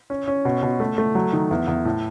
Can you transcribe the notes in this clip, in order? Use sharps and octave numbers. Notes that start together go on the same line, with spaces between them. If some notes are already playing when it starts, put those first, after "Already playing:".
C#4
C#4
B2
B2
A3
A3
F#3
D#3
E2
E2
A2